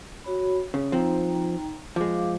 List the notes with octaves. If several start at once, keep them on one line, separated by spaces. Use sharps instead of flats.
F#4 C#5 B5
C#3 C#5
F3 C4 D#4 G5 A#5
F3 G#3 G#4 F5 D6